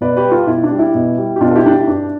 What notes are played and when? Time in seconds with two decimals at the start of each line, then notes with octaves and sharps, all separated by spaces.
0.01 B2 B4 D5
0.16 G4 B4
0.25 G3
0.31 F4 A4
0.47 B2 E4
0.64 D4
0.71 G3
0.79 E4
0.95 B2
1.18 G3
1.36 G4
1.41 B2 D4 F4
1.51 A4
1.56 E4 G4
1.64 G3 D4
1.71 E4
1.87 G2 D4